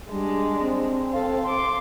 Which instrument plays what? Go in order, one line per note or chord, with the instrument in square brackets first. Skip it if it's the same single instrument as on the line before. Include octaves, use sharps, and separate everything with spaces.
[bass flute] G3 [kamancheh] G#3 D4
[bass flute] C4
[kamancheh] A4 F5
C6 D6